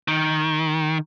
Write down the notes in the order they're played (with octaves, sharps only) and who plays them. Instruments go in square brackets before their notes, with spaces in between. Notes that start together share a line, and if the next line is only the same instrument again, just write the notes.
[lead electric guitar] D#3